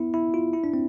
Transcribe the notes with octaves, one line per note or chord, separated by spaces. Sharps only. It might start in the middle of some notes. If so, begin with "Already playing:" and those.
Already playing: B3 E4
E4
F4
E4
D4
C4